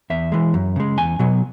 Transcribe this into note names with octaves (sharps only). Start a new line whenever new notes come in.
E2 E5
E3 G#3
F#2
C#3 G#3
E2 G#5
B2 F#3